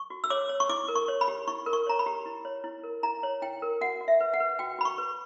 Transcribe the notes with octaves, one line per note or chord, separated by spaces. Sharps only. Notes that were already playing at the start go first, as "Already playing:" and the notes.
Already playing: C#6
F#4
E6
C#5 D6
C#5
C#6
E4 D6
A#4
C#6
C#5
B5
G4
E4 C#6
A#4
C#6
C#5 A#5
B5
G4
E4
C#5
E4
A#4
E4 A#5
C#5
E4 G5
A#4
F#4 F#5
F#4
E5
B4
F#5
B4
F#4 G5
F#4 B5
C#6
B4